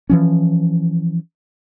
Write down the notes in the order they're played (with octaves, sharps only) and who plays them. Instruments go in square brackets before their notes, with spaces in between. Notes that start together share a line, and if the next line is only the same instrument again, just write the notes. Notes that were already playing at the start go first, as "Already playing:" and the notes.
[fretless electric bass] E3 F3 C#4